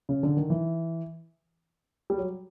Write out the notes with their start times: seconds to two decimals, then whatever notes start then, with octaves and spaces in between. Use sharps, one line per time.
0.09 C#3
0.23 D3
0.37 D#3
0.50 E3
2.10 G3
2.18 F#3